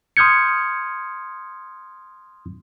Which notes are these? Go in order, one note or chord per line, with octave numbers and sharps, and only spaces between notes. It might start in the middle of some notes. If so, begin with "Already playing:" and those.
C6 D#6 F6 G6 G#6 C#7